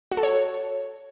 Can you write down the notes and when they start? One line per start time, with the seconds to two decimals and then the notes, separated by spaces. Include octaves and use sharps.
0.11 F#4
0.17 A4
0.23 C#5